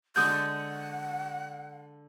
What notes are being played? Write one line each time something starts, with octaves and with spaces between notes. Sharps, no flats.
D3 G#3 D4 F#5 D#6 G6